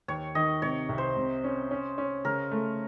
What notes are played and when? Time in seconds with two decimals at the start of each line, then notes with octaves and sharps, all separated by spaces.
0.08 D#2 C#5
0.35 D#3 D#5
0.62 C3 C#5
0.89 C2
0.98 C5
1.16 C3
1.44 C#4
1.71 C#4
1.98 C#4
2.25 C#3 A#4
2.51 A3